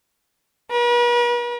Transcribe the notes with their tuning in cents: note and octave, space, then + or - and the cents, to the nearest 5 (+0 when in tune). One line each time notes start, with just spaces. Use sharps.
B4 -45